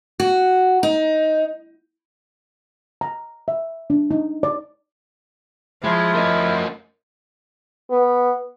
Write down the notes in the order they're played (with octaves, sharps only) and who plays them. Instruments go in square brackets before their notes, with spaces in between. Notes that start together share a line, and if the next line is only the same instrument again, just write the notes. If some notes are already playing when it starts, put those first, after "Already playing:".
[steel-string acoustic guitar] F#4
D#4
[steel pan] A#5
E5
D4
D#4
D5
[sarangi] F3 [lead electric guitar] G#3 [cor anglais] E4
[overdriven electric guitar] A3 D#5 [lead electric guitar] C#4 A#4
[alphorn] B3